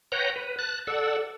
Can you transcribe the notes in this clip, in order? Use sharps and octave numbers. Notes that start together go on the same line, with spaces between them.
B4 C#5 F#5 G5 A#5
B4
A5 F#6
A4 D5 F#5 E6